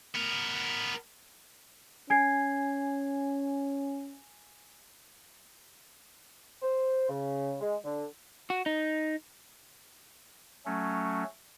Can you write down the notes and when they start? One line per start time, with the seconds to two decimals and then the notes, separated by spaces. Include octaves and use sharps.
0.15 B3 A#4
2.10 C#4 G#5 G#6 C7
6.62 C5
7.09 C#3
7.61 G#3
7.85 D3
8.50 F#4
8.66 D#4
10.66 F#3 A3 C#4